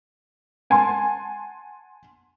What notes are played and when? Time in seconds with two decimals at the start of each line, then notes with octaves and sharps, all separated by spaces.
0.70 F#5 G#5 A5 C6